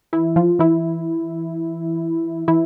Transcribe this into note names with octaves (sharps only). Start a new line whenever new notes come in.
E3 E4
F3 F4
E3 E4
E3 E4